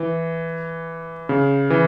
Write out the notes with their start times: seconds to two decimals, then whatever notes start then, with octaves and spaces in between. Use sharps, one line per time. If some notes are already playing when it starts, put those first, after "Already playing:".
Already playing: E3
1.29 C#3
1.70 E3